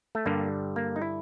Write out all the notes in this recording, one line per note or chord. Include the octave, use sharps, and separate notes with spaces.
A3
G2 D3 G3 A#3
A#3
D#4
E4